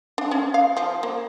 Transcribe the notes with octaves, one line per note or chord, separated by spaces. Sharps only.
D4
C#4
F5
F3
A#3